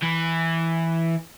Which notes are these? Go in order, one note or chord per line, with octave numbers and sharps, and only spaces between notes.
E3